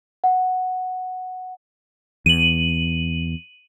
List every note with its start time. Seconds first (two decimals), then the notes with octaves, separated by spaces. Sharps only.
0.24 F#5
2.26 E2 D#7 F#7